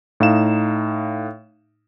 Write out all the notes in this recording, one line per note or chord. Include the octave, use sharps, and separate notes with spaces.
A2 D#4 F5 E7